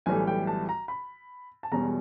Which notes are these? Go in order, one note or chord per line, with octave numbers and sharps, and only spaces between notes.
B1 A2 E3 G3 G#5
G5
A5
A#5
B5
A5
E1 E2 B2 G3 A#5